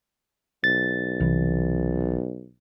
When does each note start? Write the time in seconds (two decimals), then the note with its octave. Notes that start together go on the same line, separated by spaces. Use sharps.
0.64 B1 A6
1.20 C2 C3 E3